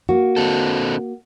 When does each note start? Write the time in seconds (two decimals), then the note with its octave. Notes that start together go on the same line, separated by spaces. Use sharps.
0.09 A#3 F#4
0.37 D3 C4 A4